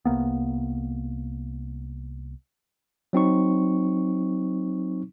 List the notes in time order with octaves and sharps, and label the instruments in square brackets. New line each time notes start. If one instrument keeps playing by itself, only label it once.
[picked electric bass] C2 A#3 B3
[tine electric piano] F#3 C4 D#4 C#6